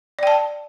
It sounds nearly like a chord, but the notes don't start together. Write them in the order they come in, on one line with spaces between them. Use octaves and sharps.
D5 G5 A5